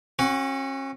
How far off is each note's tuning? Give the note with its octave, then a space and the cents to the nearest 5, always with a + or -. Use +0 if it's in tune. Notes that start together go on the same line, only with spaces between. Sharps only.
C#4 -40 F#4 +0